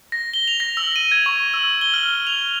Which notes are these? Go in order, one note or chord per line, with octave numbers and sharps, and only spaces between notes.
A#6
G7
F7
A#6
E6
D#7
G#6
C#6
E6
G7
F6
F7